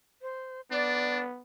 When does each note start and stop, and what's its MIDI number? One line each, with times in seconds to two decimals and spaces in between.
0.22 0.61 72
0.71 1.43 59
0.71 1.22 62
0.71 1.20 74